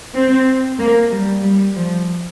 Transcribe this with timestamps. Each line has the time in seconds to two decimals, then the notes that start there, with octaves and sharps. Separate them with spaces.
0.14 C4
0.78 A#3
1.10 G3
1.42 G3
1.75 F3